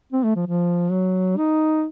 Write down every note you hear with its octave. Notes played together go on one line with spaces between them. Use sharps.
C4
A3
F3
F3
F#3
D#4